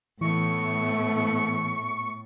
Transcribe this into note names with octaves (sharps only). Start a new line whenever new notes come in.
A2 E3 A3 B3 C#6